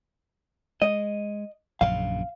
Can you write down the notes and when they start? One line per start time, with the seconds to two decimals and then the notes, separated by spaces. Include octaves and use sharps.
0.82 G#3 D#5
1.81 A#1 F#2 C#3 F5